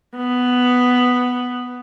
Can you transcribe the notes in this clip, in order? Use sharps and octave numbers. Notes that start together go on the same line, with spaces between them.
B3